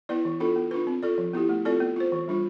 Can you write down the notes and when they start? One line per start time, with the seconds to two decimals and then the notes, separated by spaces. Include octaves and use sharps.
0.09 B3 E4 B4 D5
0.25 E3
0.40 B3 D4 F4 A4
0.56 B3
0.71 D4 F4 B4
0.87 C4
1.03 F4 A4 D5
1.18 F3
1.33 B3 E4 G4
1.49 A3
1.65 C4 F4 A4 D5
1.80 B3
1.96 F4 C5
2.12 E3
2.28 G3 D4 F4